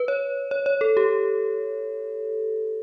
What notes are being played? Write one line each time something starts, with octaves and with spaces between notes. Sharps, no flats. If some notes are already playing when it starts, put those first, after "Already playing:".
Already playing: B4
C#5
C#5
C#5
A4
G4